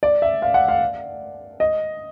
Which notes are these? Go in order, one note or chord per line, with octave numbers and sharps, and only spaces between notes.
D5
E5
F5
F#5
F5
D#5